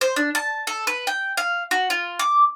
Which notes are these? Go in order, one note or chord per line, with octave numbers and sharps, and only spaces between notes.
C5
D4
A5
A4
B4
G5
F5
F#4
F4
D6